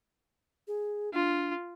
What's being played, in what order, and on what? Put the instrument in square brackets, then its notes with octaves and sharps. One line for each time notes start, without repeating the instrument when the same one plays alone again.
[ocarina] G#4
[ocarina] D4 [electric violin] F4